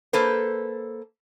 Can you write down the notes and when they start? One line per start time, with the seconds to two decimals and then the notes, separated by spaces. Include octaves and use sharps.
0.13 A#3 A4 B4 C5